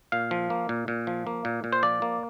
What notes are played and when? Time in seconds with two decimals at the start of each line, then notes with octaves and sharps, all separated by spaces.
0.12 A#2 F5
0.31 F3
0.50 A#3
0.69 A#2
0.88 A#2
1.07 F3
1.27 A#3
1.45 A#2
1.64 A#2
1.73 C5
1.83 F3 D5
2.02 A#3